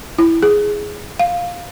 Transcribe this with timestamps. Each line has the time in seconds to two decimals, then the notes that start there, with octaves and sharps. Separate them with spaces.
0.19 E4
0.43 G#4
1.19 F5